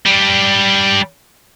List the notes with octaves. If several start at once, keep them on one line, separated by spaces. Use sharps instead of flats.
G3 D4